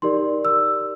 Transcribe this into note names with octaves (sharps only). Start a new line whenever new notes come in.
D#4 G4 A#4 D5 C6
E6